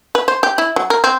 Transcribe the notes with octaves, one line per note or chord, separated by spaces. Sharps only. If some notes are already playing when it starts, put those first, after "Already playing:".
B4
C5
G4
E4
F#3
A#4
C4